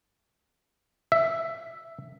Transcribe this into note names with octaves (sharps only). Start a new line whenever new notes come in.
E5